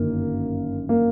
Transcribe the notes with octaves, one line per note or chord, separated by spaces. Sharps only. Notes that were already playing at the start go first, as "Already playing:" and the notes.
Already playing: G1 F#2 D#3 A#3
A#3